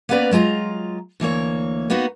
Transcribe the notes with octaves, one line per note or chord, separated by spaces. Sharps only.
A#3 B3 C#4 B4 D5 A#5
F#3 G#3 F4 A#5
D2 E3 A#3 C#5
A#3 B3 D#4 F#4